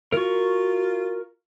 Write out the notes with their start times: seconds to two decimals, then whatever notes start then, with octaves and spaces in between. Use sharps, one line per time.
0.12 F4 F#4 A#4 C#6